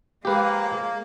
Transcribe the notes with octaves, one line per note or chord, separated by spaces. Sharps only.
F2 A#2 G#3 A#3 G4 G#4 B4